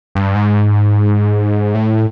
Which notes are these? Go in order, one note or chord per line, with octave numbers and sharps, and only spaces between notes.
G2
G#2
A2